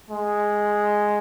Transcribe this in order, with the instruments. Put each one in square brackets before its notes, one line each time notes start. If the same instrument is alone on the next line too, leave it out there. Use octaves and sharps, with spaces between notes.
[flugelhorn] G#3